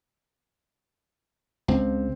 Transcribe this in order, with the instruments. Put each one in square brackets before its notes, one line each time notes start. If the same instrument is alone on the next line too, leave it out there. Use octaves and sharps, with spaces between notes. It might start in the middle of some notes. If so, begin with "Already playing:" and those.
[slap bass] C#2 [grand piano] C4